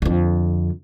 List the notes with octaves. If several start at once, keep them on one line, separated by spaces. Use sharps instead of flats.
F2 D3